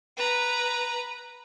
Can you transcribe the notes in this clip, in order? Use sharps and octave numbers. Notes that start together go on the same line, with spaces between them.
B4 A#5